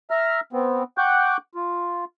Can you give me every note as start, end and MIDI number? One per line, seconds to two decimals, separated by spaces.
0.10 0.40 76
0.10 0.40 82
0.10 0.40 89
0.53 0.83 59
0.53 0.83 60
0.98 1.37 78
0.98 1.37 79
0.98 1.37 85
0.98 1.37 86
0.98 1.37 90
0.98 1.37 91
1.55 2.05 65